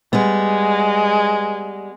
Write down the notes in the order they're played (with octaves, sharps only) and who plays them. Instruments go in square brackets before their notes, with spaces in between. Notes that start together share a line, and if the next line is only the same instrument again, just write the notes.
[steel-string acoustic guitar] G3 B3 [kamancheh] G#3